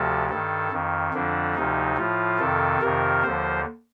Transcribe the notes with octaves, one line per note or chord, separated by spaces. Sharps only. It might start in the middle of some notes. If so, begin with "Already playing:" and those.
Already playing: D2 C3 F3 A4
G2 D#3 A4
F2 D#3
F2 D3 F3 D4
D2 C3 F3 D#4
A2 F3 F4
F2 C3 D#3 A4
F2 C3 D#3 A#4
D#2 D3 F3 C5